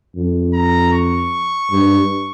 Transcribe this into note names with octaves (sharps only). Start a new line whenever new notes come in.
F2
A#5
C#6
G2